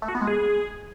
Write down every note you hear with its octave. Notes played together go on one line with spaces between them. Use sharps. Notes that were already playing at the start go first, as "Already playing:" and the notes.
A3
F#4
B3
G#3
G#4